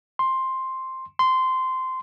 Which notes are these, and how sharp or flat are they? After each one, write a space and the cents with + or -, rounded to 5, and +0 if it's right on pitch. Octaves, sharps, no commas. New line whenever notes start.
C6 +5
C6 -15